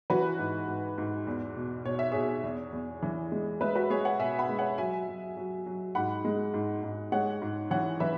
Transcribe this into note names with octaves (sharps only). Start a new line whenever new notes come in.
E3 F#4 B4
G#2
G#2
G#2
E2
B2
B2 C#5
E5
B2 G#4 C#5
E2
E2
E3
G#3
G#3 B4 E5
F#4 B4
G#3 G#4 C#5
C#5 F#5
B2 E5 G#5
F#5 B5
G#3
C#5 F#5
F#3 E5 G#5
F#3
F#3
F#3
G#2 F#5 B5
G#3
G#2
G#2
G#3 C#5 F#5
G#2
E3 C#5 F#5
E3 B4 E5